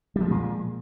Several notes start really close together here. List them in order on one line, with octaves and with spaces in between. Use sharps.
G3 F3 G#3 A#2